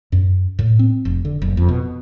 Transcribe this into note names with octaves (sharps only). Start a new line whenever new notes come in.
F#2
A2
C4
F1
D3
F#1
F2
B2